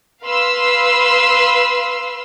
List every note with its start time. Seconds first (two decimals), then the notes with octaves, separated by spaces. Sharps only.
0.23 B4 F5 C6 E6